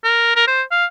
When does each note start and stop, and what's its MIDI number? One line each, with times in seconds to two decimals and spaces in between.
0.04 0.31 70
0.36 0.47 70
0.48 0.62 72
0.71 0.85 77